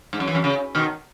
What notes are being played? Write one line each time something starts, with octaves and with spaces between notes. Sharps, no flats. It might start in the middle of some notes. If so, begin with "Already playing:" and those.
G#2
F#2
E3
F#2
C#3
B2 D#3